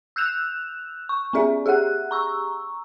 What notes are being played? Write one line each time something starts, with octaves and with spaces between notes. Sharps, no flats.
E6 F#6 G6 E7 F7
C#6
B3 C#4 G#4 D5 E5
G4 G#4 E5 F#5 F#6
A#5 C#6 E6